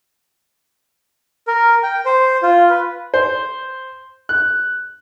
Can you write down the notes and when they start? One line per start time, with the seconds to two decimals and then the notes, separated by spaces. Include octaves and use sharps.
1.48 A#4
1.83 G5
2.06 C5
2.43 F4
2.70 B4
3.14 C5
4.29 F#6